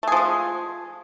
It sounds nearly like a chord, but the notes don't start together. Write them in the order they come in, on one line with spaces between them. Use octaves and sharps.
A3 G#4 F3 G#3